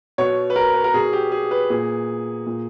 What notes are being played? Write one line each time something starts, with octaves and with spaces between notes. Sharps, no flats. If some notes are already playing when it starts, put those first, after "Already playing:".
B2 C#5
B4
A#4
B4
A#4
B2 G#4
G4
G#4
B4
A#2 G#4
A#2